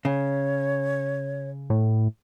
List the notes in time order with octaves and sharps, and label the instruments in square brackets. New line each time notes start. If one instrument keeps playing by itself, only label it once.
[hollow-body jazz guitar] C#3 [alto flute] C#5
[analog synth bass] A2